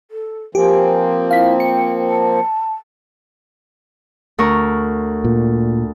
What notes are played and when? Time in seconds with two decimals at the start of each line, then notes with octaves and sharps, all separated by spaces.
0.11 A4
0.55 F3 A#3 C4 G4 G#5
1.31 E4 F5 B6
1.60 G5 C#7
2.09 A5
4.38 D2 A#4 C#6
5.25 A#2